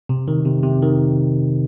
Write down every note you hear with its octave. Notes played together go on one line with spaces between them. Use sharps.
C3
D#3
C3
C3
D#3